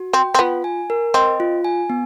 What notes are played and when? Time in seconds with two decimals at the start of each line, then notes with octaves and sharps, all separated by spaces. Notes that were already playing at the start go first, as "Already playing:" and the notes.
Already playing: F#4
0.13 C4 G5
0.35 C4
0.39 B3 F4
0.64 G#5
0.90 A#4
1.14 C4 D#5
1.40 F4
1.64 G#5
1.90 B3